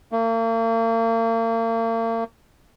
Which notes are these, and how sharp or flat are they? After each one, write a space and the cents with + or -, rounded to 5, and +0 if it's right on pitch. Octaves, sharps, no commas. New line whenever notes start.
A#3 -40